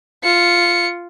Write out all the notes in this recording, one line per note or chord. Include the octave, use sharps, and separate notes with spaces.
F4 C#7